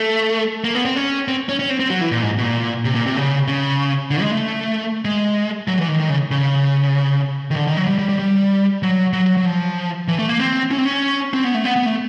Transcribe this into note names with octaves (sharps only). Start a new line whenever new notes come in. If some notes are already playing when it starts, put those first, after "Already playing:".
Already playing: A3
A#3
B3
C4
C#4
C4
C#4
C#4
C4
C4
F#3
E3
A#2
G#2
B2
A#2
C3
A#2
C3
C#3
C#3
D3
G#3
A3
G#3
F#3
E3
D#3
D#3
C#3
C#3
D#3
D3
D#3
F#3
G3
G3
G3
G3
F#3
F#3
F#3
F3
E3
A3
A#3
C4
C#4
C4
C#4
C4
B3
A3
B3
B3
A3